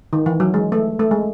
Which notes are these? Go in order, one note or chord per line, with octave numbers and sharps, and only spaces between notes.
D#3
E3
F#3
G#3
A3
A3
G#3